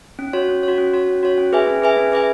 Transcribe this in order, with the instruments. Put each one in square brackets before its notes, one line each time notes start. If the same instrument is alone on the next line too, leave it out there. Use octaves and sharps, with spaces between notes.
[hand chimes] C#4
F#4 C#5
C#4
F#4 C#5
C#4
F#4 C#5
C#4
F#4 C#5
C#4
G#4 B4 E5 G#5
C#4
G#4 B4 E5 G#5
C#4
G#4 B4 E5 G#5